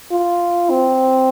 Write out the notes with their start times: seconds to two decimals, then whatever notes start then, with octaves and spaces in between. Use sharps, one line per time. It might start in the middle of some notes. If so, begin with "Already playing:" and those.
0.11 F4
0.70 C4